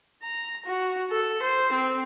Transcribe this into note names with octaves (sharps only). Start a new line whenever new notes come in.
A#5
F#4
A4
C5
C4